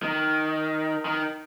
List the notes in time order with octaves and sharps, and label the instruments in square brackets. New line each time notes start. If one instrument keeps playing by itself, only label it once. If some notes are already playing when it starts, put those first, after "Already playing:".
[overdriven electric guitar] D#3
D#3